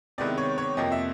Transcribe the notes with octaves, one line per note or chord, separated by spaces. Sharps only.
C3 D#3 G#3 B3 E4 D5
C#5
C#5
F2 C3 F3 A#3 D#5
E5